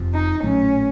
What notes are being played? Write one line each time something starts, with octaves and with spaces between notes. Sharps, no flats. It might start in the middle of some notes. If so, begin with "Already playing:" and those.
Already playing: F1 F2 C3 F3
D#4
A#1 A2 F#3 A3 C#4